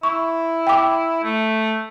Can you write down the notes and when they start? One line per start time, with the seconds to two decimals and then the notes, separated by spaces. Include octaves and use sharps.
0.03 E4 C#6
0.67 G5 D6
1.23 A3